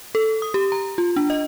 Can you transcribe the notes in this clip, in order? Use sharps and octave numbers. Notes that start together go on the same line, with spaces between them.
A4
D#6
G4
A#5
F4
D4
D#5